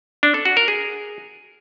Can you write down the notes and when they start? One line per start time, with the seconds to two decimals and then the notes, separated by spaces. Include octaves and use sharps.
0.23 D4
0.34 A4
0.45 F#4
0.57 A#4
0.68 G#4